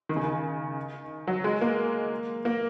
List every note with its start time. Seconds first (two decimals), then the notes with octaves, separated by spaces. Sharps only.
0.09 D#3
0.16 C#3
0.24 D#3
1.27 F#3
1.44 G#3
1.61 A#3
2.45 A#3